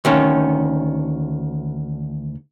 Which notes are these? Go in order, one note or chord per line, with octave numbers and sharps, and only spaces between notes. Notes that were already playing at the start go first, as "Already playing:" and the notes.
D2 D#3 C#4